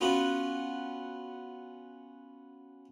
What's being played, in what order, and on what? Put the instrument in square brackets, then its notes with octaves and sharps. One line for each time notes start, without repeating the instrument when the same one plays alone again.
[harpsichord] B3 C#4 F4 F#4